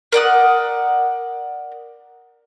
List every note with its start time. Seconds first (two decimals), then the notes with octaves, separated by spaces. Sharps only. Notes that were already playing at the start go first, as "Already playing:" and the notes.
0.12 A#4 D5 F#5 D#6